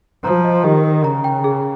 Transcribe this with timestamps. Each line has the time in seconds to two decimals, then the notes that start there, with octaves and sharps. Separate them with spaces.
0.24 F3 A#5
0.44 D#5
0.64 D#3 G4
0.84 A#4
1.04 C#3 A#5
1.24 G5
1.44 G#4